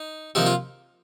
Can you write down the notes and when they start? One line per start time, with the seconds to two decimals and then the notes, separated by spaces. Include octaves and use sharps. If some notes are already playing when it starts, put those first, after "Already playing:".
Already playing: D#4
0.35 C3 F3 A#3 D#4
0.46 F4